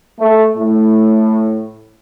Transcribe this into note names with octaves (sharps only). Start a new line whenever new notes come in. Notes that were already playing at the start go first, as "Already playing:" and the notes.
A3
A2